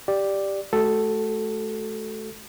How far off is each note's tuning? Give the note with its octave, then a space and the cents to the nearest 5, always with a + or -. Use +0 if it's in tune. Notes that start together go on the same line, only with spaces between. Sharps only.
G4 +0 D5 +0
A3 -35 F#4 +30 A4 +0